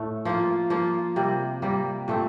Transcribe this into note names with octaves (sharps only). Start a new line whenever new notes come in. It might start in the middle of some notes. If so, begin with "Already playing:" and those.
Already playing: A2 A3
F3 A#3 F4
F3 A#3 F4
C3 G3 A#3
C3 G3 A#3
A#2 A3 C4